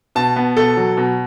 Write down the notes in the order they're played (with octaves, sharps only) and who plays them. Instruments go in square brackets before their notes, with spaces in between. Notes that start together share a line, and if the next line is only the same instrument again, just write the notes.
[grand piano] B2 A5
B3
B2 A4
F#3
B2